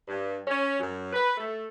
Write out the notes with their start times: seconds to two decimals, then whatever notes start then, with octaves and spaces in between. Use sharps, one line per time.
0.08 G2
0.48 C#4
0.80 F#2
1.13 B4
1.37 A3